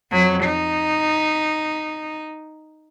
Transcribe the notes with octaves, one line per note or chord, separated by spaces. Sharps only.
F2 F#3
D#4